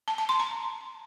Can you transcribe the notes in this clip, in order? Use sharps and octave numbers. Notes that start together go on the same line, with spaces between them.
A5
A5
C6
A#5